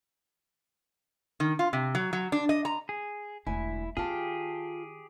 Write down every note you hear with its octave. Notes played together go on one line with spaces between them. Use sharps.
D#3
F4
C3
F#3
F#3
D4
D#5
A#5
G#4
E1 D2 E4 G#5
D#3 F4 G4 G#4 A5